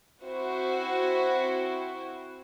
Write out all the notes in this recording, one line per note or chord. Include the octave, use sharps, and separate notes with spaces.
C4 E4 F#4 C5